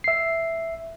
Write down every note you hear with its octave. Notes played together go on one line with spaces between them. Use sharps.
E5 C7